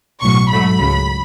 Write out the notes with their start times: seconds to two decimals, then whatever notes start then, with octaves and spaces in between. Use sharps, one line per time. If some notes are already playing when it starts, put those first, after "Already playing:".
0.21 B1 A2 F#3 C#6
0.50 G#2 F#3 A3 B5
0.78 C#2 C#3 F#3